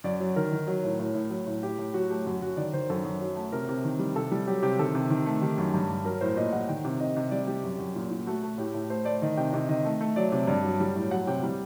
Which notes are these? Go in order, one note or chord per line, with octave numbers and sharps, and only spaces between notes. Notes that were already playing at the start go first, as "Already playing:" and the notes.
F#2 D5
F#3
D#3 A#4
D#3
F#3
A2
A2
A2
F#3
A2
A2 G4
A2
F#3 F#4
A3 G4
F#2 F#4
F#2 F#4
D#3 D5
D#3 C5
F#2 A4
F#2
F#3
A3
C3 A#4
C3
D#3
G3
C3 A4
G3
F#3 G4
C3 G4
D#3 A4
C3
D#3
A3
D#3 G4
F#2
G2
G2
F#3 A#4
A2 C5
A#2 D#5
G3 F#5
D#3 G5
C3
C3 D#5
C3
G3 D5
G3 G4
F#2
F#2
A#2
A#2
A3 F#4
A3
A2 G4
A2
A3 C5
A3 D5
D#3 D#5
C3 G5
C3 D#5
D#3 D#5
A3
A3
F#3 D5
C3
G2 D5
F#3
G3
A2
F#3 F#5
C3 G5
G3